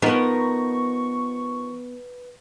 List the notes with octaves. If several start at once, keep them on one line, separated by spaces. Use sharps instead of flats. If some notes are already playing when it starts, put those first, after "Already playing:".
F3 B3 D#4 A#4 B4 C#6